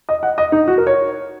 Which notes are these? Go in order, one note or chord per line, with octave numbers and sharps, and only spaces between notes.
D#5
F#5
D#5
D#4
F#4
A#4
C#5